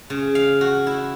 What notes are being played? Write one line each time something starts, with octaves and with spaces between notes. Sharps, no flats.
C#3
F5
F#4
E4